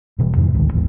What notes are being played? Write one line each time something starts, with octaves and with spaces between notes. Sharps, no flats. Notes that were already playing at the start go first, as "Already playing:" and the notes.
E1 B2 E3 G3
F2 G#2 C3 E3
A1 D2 D#3 G#3
A1 E2 G#2 B2